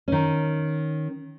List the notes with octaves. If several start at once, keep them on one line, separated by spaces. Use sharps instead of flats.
D#3 C#4